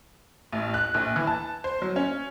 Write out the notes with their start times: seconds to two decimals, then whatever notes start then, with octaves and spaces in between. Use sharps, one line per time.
0.53 A1
0.74 F#6
0.94 A#1
1.16 E3
1.27 A5
1.64 C5
1.82 F#3
1.96 C#4